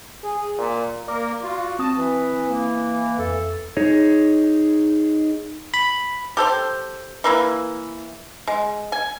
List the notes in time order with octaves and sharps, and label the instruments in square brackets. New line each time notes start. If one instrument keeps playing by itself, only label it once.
[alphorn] G#4
A#2
[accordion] A#3 A#4 [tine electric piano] D5 D6
[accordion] F4 [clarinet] F#4
[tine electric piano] C4 D#6 [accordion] A5
[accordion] E3 [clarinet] B4
[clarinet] A#3
[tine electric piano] F2 [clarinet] A4
[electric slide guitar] D#4 G#4 C#5
[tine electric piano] B5
[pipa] G4 A4 C5
E3 A#3 E4
G#3
G#5